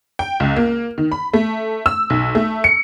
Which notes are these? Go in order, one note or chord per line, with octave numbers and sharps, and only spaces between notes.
G5
C#2
A#3
D#3
B5
A3
E6
B1
A3
C#7